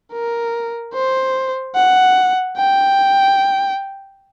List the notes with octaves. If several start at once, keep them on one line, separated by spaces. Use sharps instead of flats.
A#4
C5
F#5
G5